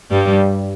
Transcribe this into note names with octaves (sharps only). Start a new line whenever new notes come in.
G2 G3